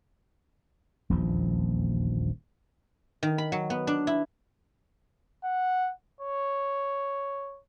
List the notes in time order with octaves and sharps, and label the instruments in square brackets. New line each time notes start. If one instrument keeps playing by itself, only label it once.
[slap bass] D#1 A#1 E2 F3
[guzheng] D#3
B5
F#3
B3
D4
E4
[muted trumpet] F#5
C#5